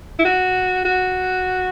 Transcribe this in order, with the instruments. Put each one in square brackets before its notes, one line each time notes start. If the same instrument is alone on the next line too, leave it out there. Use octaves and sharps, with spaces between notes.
[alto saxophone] E4
F#4
F#4